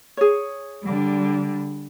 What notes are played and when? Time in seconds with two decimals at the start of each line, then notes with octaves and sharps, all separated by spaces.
0.17 G#4 C#5
0.83 D3 G3